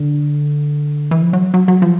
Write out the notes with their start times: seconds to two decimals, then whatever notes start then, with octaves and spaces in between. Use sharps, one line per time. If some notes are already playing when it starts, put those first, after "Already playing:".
Already playing: D3
1.11 E3
1.22 F3
1.33 F#3
1.54 F#3
1.68 F#3
1.82 F3